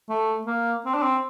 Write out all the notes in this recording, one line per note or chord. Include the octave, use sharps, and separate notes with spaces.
A3
A#3
C4
D4
C4